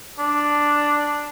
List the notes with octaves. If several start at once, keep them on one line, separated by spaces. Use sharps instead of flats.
D4